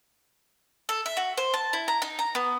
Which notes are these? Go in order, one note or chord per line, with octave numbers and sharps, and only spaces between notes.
A4
E5
F#4
C5
A5
E4
A#5
D#4
A#5
B3